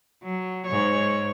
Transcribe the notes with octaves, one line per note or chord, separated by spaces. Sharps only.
F#3
G#2 C#5